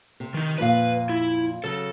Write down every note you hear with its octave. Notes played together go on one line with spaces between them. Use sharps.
C3
D#3 D#4
F2 A#2 B4 F5
E4
C#3 F#3 A4